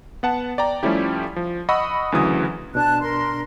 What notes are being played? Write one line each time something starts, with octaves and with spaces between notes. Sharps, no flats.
B3 F#5 A5
D5 G5 A#5
F3 G3 A3 C#4 E4 G4
F3
D#5 F#5 B5 C#6 D#6 E6
D2 C#3 E3 F#3 D#6
B2 D4 A5 F#6
A#4 C6